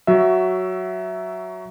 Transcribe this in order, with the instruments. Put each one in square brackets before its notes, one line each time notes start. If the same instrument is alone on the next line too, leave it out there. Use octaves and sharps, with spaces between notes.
[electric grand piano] F#3 F#4 E5